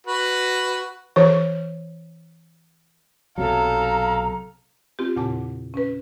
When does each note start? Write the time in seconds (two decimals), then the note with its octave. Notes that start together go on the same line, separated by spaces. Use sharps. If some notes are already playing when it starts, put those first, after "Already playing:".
0.07 F#4 B4
1.16 E3 C#5
3.38 B1 C3 F#3 A4 F5 A#5
4.99 C4 F4 G4
5.16 E2 A#2 C#3 F#5 A5 D6
5.74 C#4 B4